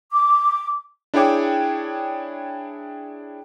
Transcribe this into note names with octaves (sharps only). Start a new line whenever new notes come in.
D6
D4 E4 G#4 C#5 G5 D6